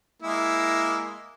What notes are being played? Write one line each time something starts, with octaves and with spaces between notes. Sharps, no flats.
G#3 A#3 E4